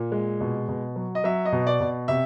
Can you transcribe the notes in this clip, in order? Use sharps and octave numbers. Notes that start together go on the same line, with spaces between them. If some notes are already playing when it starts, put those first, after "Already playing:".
Already playing: A#2
G#3
B2
B2
F#3
D#5
F#3 E5
D#5
B2
D5
B2
C3 E5